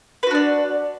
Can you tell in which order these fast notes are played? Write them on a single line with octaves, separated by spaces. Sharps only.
B4 F#4 D4 D5